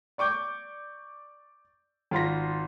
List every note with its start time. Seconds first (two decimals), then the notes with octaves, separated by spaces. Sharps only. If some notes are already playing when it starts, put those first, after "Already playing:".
0.18 D5 C#6 D6 G6
2.11 G#1 F4 C6 A#6